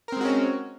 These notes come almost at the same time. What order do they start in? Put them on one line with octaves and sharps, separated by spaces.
A#4 C4 G#3 F#4 C#4